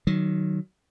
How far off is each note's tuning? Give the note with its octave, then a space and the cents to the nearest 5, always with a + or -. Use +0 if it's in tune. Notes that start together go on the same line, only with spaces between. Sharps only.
D#3 -15 F#3 +15